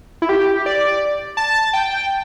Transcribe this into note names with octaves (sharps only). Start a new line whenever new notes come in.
E4
G4
D5
A5
G5